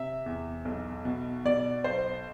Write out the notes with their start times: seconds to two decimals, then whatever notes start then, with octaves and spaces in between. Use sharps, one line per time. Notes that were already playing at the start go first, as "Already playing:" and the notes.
Already playing: C3 E5
0.26 E2
0.65 B1
1.05 B2
1.45 B2 D5
1.84 B1 C5